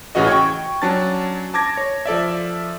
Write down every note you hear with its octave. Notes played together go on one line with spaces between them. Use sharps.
A1 C#3 E3 F#4 D#5
G5 C#6 G#6
F#3 C#4 D4 A5 A6
A5 D6 G#6 A#6
C#5
F3 A4 D5 E5